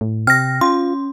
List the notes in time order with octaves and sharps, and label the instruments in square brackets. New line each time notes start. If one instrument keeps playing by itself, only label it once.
[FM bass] A2
[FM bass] C3 [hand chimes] G5 [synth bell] F6 A#6
[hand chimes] C#4 [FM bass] F4 [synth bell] C6